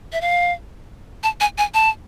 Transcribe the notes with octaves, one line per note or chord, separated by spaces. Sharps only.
E5
F5
A5
G#5
G#5
A5